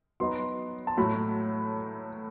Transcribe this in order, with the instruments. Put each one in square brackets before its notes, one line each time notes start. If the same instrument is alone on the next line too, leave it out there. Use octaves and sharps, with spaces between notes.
[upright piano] F#3 B3 D#4 C6
A5
A2 F#3 A3 B5